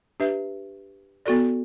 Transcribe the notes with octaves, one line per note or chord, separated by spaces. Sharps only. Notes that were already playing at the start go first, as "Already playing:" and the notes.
D4 G4 B4 E5
B3 F#4 A4 D5